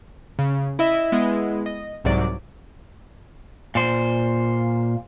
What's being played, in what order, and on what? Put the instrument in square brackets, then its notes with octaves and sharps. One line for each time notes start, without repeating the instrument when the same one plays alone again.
[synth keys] C#3
E4 D#5 E5 E6
G#3 B3 E4 D#5
D#5
C2 G#2 C3 F#3 D5 D7
[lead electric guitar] A#2 C5